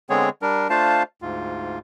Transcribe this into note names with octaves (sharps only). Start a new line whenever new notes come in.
D3 G#3 B3 C4 G#4 C#5
G3 D4 A#4
A3 D4 F4 C5 F5 A5
D2 G#2 F4